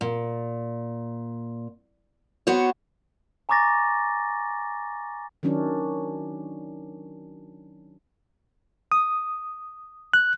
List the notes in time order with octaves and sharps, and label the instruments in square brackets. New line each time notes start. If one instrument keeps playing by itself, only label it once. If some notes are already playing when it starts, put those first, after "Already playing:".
[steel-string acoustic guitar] A#2
B3 F#4 C5 C#5
[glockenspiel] G#5 A#5 C#6 D6 A6 A#6
[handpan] D#3 F#3 C#4 D4
[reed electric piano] D#6
F#6